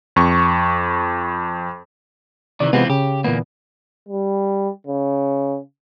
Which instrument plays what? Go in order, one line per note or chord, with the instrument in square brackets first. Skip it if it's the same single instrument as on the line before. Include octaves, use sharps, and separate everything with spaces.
[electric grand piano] F2 C#6
[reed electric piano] C3 D5 [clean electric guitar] D#3 E3
[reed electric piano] C3 G#3 B3 [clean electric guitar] E3 C4 F4
[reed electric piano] C#3 [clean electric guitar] G4
[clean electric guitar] D2 A#3 [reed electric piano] A#2 E3 B3
[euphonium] G3
C#3